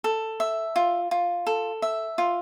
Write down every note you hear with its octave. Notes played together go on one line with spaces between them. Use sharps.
A4
E5
F4
F4
A4
E5
F4